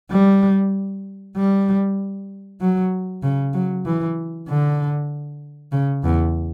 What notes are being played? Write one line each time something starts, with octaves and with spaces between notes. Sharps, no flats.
G3
G3
F#3
C#3
F#3
E3
D3
C#3
E2